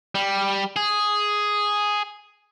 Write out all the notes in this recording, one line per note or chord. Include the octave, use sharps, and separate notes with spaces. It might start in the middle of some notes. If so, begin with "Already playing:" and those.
G3
G#4